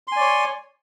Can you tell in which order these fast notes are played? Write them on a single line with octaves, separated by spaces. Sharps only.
C6 G#5 D5 C#5